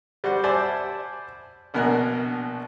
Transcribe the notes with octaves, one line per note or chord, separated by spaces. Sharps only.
G3 F#4 C5 F#5
C5 D5 E5 G#5 A5 B5
A#1 B2 A#4 G#5 F#6